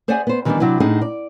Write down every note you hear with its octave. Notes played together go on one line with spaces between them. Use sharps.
G#4 C5 D5 E5 F#5 G#5
B3 C5
D#3 E3 G3 A3 B3 D4
C3 F#3 D4 E4
A2 D4 D#4 G#4 F#5
D5